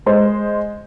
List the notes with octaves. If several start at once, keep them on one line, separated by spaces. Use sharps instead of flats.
G#3 C5